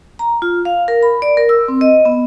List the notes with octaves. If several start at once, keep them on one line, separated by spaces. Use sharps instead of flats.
A#5
F4
F5
A#4
B5
D5
A#4
E6
C4
D#5
B3